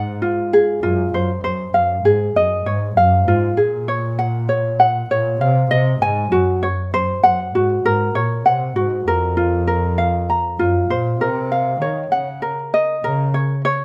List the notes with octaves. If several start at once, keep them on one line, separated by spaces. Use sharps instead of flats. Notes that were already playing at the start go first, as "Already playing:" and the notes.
Already playing: G#2 F#5
F4
G#4
F#2 F4
F#2 C5
F#2 C5
F#2 F5
G#2 G#4
F#2 D#5
G#2 C#5
F#2 F5
G#2 F4
A#2 G#4
C#5
F#5
C#5
F#5
A#2 C#5
C3 F5
C3 D#5
G#2 G#5
F#2 F#4
C#5
F#2 C5
F#2 F#5
G#2 F#4
G#2 A#4
A#2 C#5
C3 F#5
G#2 F#4
F2 A#4
F4
A#4
F5
A#5
F#2 F4
A#2 C5
C3 A#4
F5
D#3 C#5
C#3 F#5
A#4
D#5
C#3 A#4
C#5
C#5